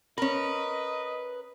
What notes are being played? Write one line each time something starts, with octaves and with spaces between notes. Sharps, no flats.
C#4 A#4 B4 D#5